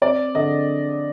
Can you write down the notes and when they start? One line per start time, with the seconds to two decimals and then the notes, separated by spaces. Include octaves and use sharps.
0.02 C4 D5
0.35 D3 D#5